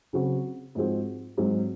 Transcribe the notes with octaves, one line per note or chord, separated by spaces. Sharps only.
C#3 F#3 C4 F#4
G#2 F3 G#3 C4 F#4
G#2 F#3 C4